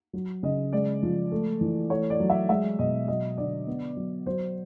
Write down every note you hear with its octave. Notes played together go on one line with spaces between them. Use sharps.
F#3
C#3 D#5
G#3 D5
F3
A3
E3
A3 C#5
D5
F#3
E5
G#3 E5
B2 D#5
F#3 D#5
D3 D5
B3
F#3
F#3 C5